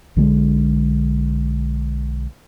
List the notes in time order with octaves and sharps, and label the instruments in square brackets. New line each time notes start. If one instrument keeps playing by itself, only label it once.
[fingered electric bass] B1 D3 G3 G#3